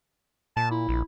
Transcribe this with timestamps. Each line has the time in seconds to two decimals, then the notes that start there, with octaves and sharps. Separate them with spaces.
0.57 A#2 A5
0.71 E4
0.89 A#1